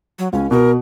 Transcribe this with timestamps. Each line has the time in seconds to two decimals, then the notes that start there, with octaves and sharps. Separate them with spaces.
0.19 F#3
0.33 C#2 C#4
0.51 B2 A#4